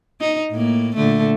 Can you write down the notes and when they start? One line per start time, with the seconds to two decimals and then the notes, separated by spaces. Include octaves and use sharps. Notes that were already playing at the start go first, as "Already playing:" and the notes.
0.21 D#4
0.51 A2 A#3
0.96 A#2 D3 A3